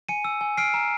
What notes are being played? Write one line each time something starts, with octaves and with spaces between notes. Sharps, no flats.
G#5 C#7 D#7
E6
G#5
F6 C7 D7
A#5